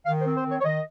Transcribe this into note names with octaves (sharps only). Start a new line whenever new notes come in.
D#3 F5
C5
C4
C5
D#3
C#5
C#5
D#3 D#5